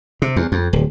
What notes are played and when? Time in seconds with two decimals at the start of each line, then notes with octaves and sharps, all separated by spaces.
0.22 C3
0.36 E2
0.52 F2
0.73 D1